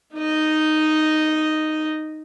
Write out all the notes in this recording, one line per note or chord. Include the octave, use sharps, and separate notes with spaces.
D#4 D#5